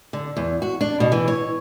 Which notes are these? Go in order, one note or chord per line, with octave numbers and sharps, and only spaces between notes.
D3
E2
F#4
D4
B2
E3
C#5